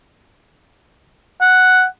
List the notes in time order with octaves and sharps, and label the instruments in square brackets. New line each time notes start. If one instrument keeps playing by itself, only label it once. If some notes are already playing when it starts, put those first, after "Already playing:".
[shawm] F#5